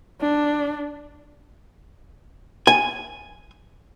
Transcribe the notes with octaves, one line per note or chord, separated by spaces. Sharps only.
D4
G#5